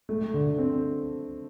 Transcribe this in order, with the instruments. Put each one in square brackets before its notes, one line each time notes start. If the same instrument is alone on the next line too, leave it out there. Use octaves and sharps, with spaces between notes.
[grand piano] A3
D3
C4